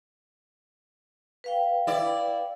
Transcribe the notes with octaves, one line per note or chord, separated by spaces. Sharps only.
B4 F5 G5
E4 D5